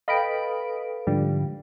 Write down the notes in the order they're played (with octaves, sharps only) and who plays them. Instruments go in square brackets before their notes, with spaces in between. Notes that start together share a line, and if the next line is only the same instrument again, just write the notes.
[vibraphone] A4 B4 [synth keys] D#5 B5 D7 [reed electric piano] F5 G5
[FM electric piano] G#2 D3 F3 [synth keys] G3